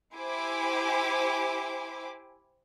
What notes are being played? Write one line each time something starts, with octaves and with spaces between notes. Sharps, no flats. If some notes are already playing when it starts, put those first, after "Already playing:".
E4 G4 C5 G#5 D6